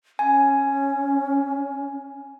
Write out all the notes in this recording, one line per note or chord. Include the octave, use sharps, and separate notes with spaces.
C#4 G#5